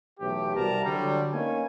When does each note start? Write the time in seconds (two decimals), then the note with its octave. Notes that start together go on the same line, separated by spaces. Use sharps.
0.20 B1 A2 E3 G4
0.56 C2 G3 F#4 A#4 A5 A#5
0.85 D3 F#3 G3
1.33 A#3 C#4 D#4 B4 C#5 G#5